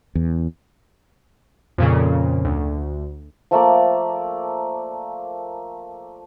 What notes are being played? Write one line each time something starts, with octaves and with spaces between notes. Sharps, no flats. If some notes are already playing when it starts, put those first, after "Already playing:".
E2
F2 A#2 C#3
D2
F3 A3 A#3 D5